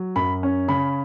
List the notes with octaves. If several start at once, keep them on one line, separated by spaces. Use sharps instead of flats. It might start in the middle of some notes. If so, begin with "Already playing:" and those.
Already playing: F#3
F#2 B5
C#4
C#3 B5